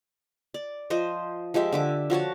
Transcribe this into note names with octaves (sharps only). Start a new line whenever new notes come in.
D5
F3 C5 D#5
F3 G#3 G4 E5
D3 E5 D6
F3 F#4 C#5 A5